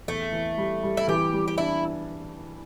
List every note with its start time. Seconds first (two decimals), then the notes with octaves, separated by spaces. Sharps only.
0.08 E2 A3
0.32 E3
0.58 G3
0.83 G3
0.97 E4
1.08 E3 G4
1.33 G3
1.48 G4
1.58 D4 E4